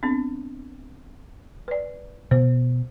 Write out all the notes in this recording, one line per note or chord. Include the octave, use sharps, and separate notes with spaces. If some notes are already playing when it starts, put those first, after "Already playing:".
B3 C4 D4
B4 D5
B2 B3 C5